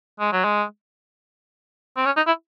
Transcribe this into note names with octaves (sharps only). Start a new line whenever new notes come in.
G#3
F#3
G#3
C4
C#4
D#4
E4